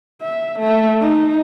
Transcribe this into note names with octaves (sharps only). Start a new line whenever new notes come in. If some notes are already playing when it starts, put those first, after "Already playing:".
E5
A3 E5
D#4